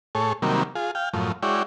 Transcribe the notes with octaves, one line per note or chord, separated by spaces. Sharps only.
A2 G#4 A4 C#5
C3 D#3 F#3 G3 A#3
F4 G#4
F5 G5
F#2 A2 F3
G#3 E4 F#4 C#5 D5 G5